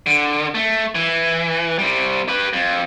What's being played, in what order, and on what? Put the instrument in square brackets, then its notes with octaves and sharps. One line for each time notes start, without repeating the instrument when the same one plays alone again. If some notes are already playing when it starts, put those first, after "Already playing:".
[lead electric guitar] D3
A3
E3
C3 G3
G4 B4
F2